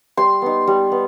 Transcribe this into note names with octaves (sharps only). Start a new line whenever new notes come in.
G3 C6
B3 D#4
G3
B3